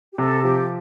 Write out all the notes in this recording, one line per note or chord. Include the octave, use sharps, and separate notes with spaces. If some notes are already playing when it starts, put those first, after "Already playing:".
G4
C3 A4
F3 G4